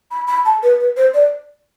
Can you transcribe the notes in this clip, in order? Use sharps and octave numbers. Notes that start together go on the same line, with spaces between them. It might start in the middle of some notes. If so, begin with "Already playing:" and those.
B5
B5
A5
B4
B4
C5
D5